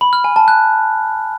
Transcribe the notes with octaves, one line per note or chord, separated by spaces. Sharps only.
B5
F6
G#5
A5
F#6